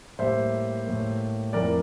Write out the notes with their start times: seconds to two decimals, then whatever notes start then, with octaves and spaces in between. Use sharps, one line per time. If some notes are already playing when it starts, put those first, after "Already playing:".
0.19 A2 G3 A#3 C5 E5
0.87 A2 G3 A#3
1.53 F2 E3 A3 C4 A#4 D5